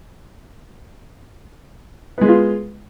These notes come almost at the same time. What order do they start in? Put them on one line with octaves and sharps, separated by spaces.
B3 G#3 B4 F4